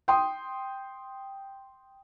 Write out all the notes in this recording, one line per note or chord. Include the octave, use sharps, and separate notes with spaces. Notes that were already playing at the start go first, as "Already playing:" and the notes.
G5 C6 D#6